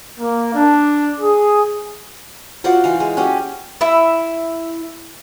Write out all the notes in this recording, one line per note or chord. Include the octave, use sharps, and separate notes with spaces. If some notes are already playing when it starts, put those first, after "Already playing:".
A#3
D4
G#4
F4 F#4 C5 D5
E3 F5
G#3
C#4 F#4 G4
E4 E5